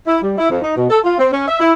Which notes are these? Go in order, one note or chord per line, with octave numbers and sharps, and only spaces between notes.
E4
G3
E4
F2
D#4
B2
A4
F4
C4
C#4
E5
E4